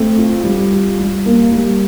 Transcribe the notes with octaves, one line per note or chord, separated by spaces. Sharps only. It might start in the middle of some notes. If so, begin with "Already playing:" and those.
Already playing: A3 C4
F4
G3
F4
G3
A#3
G3